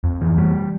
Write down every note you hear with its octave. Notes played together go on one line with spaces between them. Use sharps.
F2
E3
G3